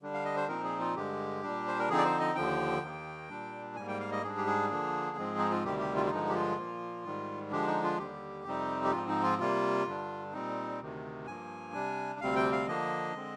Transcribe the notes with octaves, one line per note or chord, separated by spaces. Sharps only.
D3 G3 D4
F5
D#5
C5
A#2 F3 C4 D#4 A#4
G#4
F4
G2 D3 G#3 G4
A#2 G3 D4
C5
A#4
D3 F3 C4 D#4 G#4
D5
C5
D#5
D#2 D3 F3 G5
D#2 D#3 A#3
A#2 G3 D4
G#2 G3 A#3 G#5
G5
F5
D#5
G#2 G3 D4 G#4
G4
G#4
D3 F3 A#3 D4
G#2 F3 G#3 C4
D#4
F4
D2 C3 D#3 G3 G4
G4
F4
F4
G2 D3 F3 G#3 D#4
G4
F4
A#2 F3 A#3
G#2 D#3 G3
D3 F3 G#3 D4 G4
D#4
F4
D#2 D3 G3 G4
F2 C3 G3 C4 D#4
G4
G#2 F3 C4 D#4 F4
D#4
F4
C3 G3 A#3 F4
G2 D3 G3 D4
A#2 G3 C4 D#4
D2 C3 D#3
G2 F3 A#3 G#5
C3 G3 D4
D2 C3 G3 C4 F5
G5
F5
D3 F3 A#3 D4 D#5
D3 G#3 C4